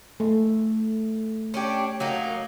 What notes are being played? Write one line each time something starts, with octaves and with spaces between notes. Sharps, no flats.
A3
C#4 D4 G4
F#3 A#3 D#4